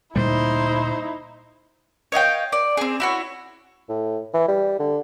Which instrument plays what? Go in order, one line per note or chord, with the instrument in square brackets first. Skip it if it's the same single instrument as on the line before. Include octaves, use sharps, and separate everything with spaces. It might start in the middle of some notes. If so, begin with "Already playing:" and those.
[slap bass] D2 A#2 G3 [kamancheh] D#4 E4 [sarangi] C5
[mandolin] C#5 D#5 F5 G5
D5
C4 G#4
E4 F#4 C#5
[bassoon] A2
E3
G3
D3